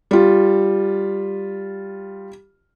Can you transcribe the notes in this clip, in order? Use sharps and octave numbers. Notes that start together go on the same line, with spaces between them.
G3 F4